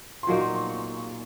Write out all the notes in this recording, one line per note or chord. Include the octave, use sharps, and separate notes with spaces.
C6
A#2 F#3 A#3 D#4 C#6
C6
C6
C#6